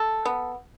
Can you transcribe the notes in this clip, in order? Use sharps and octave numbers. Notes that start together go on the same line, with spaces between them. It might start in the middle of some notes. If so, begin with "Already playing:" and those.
Already playing: A4
B3